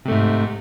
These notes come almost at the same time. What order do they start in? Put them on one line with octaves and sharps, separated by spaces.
C3 A3 G#2